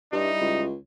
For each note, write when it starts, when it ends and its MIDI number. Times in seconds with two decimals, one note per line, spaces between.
0.12 0.30 43
0.12 0.68 55
0.12 0.63 63
0.12 0.68 64
0.41 0.75 37